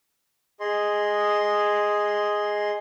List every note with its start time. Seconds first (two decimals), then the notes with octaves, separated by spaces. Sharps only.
0.60 G#4 D#5 C6